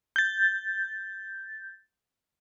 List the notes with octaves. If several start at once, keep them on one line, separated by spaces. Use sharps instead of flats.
G6 A6